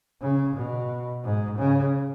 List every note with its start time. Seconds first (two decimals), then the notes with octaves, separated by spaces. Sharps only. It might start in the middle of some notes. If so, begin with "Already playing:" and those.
0.21 C#3
0.56 B2
1.24 G#2
1.59 C#3